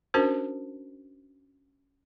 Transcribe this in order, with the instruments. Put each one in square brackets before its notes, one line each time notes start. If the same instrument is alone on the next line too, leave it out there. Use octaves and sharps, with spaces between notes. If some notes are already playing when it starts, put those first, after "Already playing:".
[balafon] C#4 D4 F#4 A#4 C5